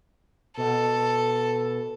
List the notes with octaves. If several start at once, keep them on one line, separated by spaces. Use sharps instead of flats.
B2 A4